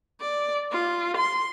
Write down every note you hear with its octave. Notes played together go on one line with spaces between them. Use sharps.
D5
F4
C6